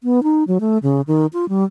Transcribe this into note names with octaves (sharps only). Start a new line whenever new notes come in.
B3
D#4
F#3
A3
C#3
D#3
F4
G3